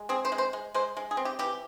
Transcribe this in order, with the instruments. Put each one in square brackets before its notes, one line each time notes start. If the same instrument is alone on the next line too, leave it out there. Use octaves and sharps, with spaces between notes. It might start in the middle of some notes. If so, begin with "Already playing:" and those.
Already playing: [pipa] G#3
C4 G#4
C5
G#3
C5
G#3
G#3 C5
G#3
G#4
C4
G4
E3 G4